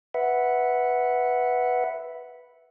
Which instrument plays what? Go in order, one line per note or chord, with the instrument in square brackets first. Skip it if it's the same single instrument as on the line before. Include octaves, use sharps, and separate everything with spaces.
[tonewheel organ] B4 E5 F#5